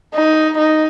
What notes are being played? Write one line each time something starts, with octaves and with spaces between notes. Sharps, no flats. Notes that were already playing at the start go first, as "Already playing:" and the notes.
D#4
D#4